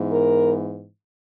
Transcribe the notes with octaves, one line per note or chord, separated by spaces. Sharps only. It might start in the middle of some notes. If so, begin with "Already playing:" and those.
Already playing: G#2 E3 B3
A#4